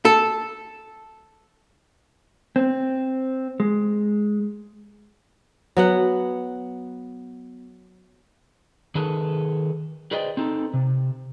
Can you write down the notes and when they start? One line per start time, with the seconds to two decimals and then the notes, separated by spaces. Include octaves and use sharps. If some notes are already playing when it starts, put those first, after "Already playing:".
0.05 A4
2.56 C4
3.60 G#3
5.77 F#3 B3 F#5
8.95 D#3 G#4 A4 B4
10.11 G#4 B4 C5 D5 D#5 G5
10.37 C4 D#4 A4
10.74 C3